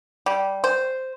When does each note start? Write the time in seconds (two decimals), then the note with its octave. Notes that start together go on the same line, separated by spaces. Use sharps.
0.26 G3
0.64 C5